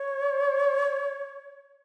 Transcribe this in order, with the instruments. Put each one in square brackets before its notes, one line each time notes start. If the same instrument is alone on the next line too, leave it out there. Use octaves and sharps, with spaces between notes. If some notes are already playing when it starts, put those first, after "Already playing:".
Already playing: [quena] C#5